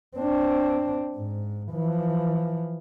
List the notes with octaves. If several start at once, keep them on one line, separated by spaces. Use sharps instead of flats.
C4 D4
G#2
E3 F3